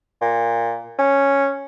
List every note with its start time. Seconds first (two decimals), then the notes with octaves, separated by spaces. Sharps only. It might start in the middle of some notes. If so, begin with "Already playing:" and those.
0.21 A#2
0.99 C#4